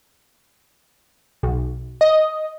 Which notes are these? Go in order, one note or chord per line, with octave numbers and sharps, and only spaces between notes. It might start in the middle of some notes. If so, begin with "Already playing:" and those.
B1
D#5